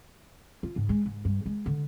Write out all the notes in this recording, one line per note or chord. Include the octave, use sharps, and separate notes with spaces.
F4
G#2
G#3
G#2
G2
G#3
D3